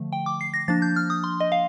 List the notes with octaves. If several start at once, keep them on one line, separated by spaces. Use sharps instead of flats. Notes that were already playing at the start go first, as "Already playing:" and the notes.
Already playing: D3 F3 A3
G5
D6
C7
A#6
F3 A#3 D4 A6
G6
F6
D#6
C6
D#5
F5